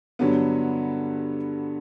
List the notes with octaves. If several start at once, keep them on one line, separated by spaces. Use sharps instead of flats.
G2 D3 F#3 B3